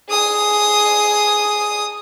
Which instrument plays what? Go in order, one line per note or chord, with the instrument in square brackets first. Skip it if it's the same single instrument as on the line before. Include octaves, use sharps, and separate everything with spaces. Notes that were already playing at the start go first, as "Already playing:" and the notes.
[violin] G#4 D#6